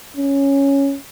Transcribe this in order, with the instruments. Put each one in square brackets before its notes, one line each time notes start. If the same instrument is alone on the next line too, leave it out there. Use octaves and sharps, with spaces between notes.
[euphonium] C#4